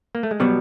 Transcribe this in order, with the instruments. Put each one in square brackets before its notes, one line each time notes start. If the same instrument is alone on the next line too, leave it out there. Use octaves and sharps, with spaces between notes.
[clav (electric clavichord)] A#3
A3
G#3
[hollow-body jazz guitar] B2 F#3 B3 [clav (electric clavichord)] G3